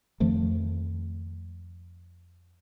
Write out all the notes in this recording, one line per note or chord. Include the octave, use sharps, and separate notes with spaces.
F2 D#3 F3 A3